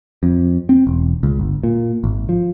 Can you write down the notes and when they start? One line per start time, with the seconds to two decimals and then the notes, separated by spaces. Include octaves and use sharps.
0.23 F2
0.69 C4
0.87 E1
1.23 C#2
1.39 G1
1.63 A#2
2.04 G#1
2.29 F3